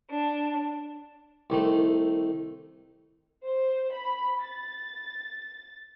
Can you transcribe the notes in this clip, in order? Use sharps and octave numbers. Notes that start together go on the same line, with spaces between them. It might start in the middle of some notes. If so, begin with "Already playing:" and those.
D4
C2 D#3 A3
C5
B5
A6